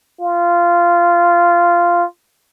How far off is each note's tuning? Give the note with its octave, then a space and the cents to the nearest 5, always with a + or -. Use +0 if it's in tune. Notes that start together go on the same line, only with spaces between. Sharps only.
F4 -10